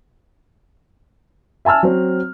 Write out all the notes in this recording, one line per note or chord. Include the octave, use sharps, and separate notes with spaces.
E5 G#5 A5 E6 F6
F#3 C4